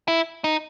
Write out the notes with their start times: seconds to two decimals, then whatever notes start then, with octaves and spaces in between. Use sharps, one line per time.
0.08 E4
0.44 D#4